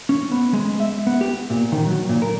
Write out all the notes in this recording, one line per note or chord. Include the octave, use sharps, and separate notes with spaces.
C#4
B3
G#3
E5
B3
G4
A#2
D#3
F#3
A#2
A#4